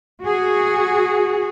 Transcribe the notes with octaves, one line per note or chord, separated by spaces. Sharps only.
F#4 G#4